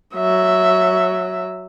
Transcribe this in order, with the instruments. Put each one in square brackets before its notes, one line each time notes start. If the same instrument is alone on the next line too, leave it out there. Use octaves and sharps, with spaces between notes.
[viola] F#3 E5